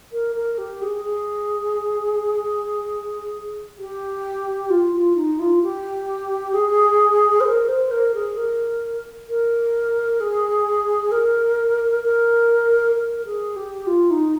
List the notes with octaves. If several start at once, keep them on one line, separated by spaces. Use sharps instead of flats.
A#4
A#4
G4
G#4
G#4
G4
F4
F4
D#4
F4
G4
G#4
C5
A#4
C5
A#4
G#4
A#4
A#4
G#4
A#4
A#4
A#4
G#4
G4
F4
D#4